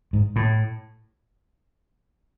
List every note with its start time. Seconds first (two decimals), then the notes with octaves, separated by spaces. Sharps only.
0.13 G#2
0.36 A2